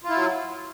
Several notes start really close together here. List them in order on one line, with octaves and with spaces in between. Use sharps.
F4 E4 F#3